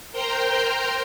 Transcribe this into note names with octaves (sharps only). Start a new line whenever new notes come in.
A#4 C5 G5 A#5 C6